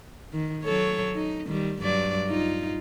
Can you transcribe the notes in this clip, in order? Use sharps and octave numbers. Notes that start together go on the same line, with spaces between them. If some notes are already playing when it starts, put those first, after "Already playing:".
D#3
F#3 A4 C#5
D#4
D#3 G3
G2 F#3 D5
D#4 F4